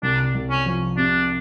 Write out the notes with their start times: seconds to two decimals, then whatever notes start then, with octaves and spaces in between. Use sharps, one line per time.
0.03 C2 D4
0.35 C2
0.50 C#4
0.66 F3
0.97 C3 D4